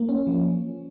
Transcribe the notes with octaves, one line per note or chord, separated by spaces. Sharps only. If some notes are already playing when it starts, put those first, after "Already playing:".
Already playing: A#3
C#4
F3